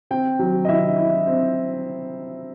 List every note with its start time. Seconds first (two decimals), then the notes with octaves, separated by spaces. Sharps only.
0.11 C4 G5
0.39 F#3
0.65 D#5
0.68 E4 E5
0.98 E4
1.27 C4